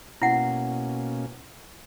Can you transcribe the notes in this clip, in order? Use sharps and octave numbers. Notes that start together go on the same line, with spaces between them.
B2 A#3 C#4 E4 F#5